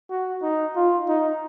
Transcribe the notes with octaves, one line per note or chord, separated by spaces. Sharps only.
F#4
D#4
F4
D#4